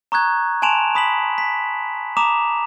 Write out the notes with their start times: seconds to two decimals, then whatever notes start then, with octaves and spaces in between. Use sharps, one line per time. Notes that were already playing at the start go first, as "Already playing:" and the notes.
0.12 A#5 C#6 D#6 F#6 G#6
0.62 G#5 A5 C6 D7 E7 F7
0.95 B5 D#6 B6 F7 F#7
1.38 B6
2.17 A#5 D6 D#6 E7 F7